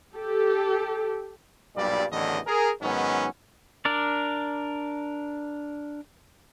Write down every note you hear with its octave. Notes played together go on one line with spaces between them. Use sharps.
G4 A4
B1 G2 A#2 G3 D5
A1 E2 A2 D3 D#3 D#5
G#4 A#4
G#2 D#3 F#3 B3 C#4
D4 A#4 D5